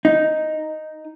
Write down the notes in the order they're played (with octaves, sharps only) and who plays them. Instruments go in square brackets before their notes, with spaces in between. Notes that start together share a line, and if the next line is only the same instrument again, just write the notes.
[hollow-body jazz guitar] D#4